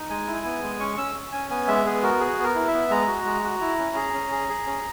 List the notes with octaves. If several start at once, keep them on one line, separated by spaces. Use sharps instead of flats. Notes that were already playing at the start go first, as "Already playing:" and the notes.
Already playing: D#4
G#3 G#5
E4
B3
G#3
C#4 C#6
C#4 E6
C#4
C#4 G#5
B3 G#5
G#3 E5
B3 G#4
F#4 A#4
G#4
B3 A#4
E4
E5
B3
G#3 A#5
F#4
G#3
F#4
E4
C#4
G#4
C#4
G#4
G#4
C#4